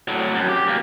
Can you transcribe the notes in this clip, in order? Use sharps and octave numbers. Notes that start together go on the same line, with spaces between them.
A2 F#3
F#2
G4
F#2 A#3